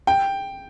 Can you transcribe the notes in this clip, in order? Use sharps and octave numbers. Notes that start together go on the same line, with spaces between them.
G5